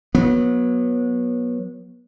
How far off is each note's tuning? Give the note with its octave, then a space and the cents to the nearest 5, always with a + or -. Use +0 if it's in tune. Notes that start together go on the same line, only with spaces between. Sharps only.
F#3 -25 B3 -30